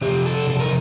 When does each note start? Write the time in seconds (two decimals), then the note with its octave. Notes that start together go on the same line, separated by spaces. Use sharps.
0.01 F2 C3 G4
0.26 A4
0.50 A4
0.60 A#4